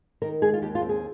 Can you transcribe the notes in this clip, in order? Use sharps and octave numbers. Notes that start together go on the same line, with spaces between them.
D#3 A#4
G#3 G#4
F4
D#2 G4
F4
C4
G#4